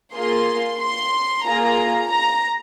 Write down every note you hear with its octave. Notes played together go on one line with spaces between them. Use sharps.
A#3 F4 G#4 C6
C6
A#3 F4 G#4 A#5
A#5